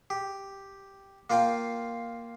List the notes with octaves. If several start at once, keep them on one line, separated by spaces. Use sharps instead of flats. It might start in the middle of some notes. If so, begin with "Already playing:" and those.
G4
A#3 F4 F5 G5